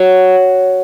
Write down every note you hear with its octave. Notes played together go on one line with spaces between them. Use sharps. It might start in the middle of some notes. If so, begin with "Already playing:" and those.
Already playing: F#3